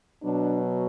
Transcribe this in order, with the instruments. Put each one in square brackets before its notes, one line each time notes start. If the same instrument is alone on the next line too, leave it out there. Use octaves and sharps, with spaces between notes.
[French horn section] B2 F#3 D4